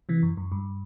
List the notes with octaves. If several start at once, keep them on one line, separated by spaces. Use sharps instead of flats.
C3 E3
F#2
F#2
G2